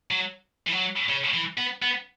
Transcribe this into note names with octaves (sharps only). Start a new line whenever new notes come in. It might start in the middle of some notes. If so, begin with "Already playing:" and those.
F#3
E3
F#3
C#3
E3
B3
B3